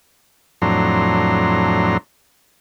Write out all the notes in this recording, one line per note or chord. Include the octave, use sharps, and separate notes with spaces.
F2 A2 F#3 D4 A#5 C6